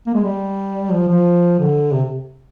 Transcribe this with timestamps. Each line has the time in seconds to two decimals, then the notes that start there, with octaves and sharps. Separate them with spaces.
0.07 A#3
0.14 G#3
0.24 G3
0.92 F3
1.08 F3
1.59 D3
1.93 C3